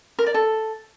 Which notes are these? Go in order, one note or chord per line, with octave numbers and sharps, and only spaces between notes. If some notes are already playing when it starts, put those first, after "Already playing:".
A#4
D5
A4